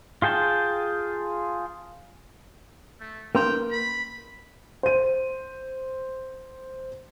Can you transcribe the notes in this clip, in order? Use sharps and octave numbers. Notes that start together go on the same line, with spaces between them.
F4 G#4 G5 A5
A3
A#3 C#4 B4 G5 C6
B5
C5 D#7